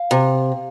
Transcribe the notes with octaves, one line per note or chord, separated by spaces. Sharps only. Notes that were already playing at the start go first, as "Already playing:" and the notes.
Already playing: F5
C3